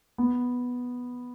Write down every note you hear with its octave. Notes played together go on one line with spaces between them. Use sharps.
B3